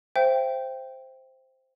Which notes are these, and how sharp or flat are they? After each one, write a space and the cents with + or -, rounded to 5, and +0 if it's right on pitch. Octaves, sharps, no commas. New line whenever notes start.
C5 +0 E5 +45 G5 +0